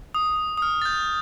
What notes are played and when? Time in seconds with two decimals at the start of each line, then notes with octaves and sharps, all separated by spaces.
0.14 D#6
0.57 D#6
0.62 F6
0.82 A6
0.85 G6